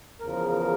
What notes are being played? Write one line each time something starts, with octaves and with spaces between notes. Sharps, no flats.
E2 C#3 F3 A#4
A#4